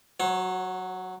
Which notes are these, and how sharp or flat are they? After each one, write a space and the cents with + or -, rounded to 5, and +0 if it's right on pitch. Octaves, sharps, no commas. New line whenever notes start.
F#3 +0 C#5 -40